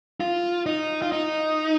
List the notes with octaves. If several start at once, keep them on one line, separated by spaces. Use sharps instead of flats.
F4
D#4
F4
D#4